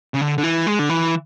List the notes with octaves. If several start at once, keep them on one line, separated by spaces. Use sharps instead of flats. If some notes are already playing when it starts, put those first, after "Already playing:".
C#3
D3
D3
E3
G#3
D3
E3